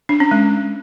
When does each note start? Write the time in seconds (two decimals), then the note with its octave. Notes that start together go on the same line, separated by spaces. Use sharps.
0.09 D4
0.20 C#4
0.31 G#3